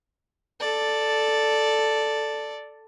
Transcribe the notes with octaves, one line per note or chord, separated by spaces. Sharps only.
A4 D5